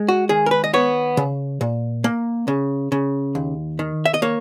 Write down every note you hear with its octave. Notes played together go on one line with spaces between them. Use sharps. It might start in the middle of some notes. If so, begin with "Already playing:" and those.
Already playing: G#3
F#4
D#3 G#4
A#4
B4
D#5
B3 C#5
C#3
A#2
A#3
C#3
C#3
D#2
D#3
E5
D#5
A#3 C#5